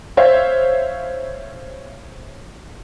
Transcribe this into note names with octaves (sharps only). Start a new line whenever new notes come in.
C5 C#5 E5 F5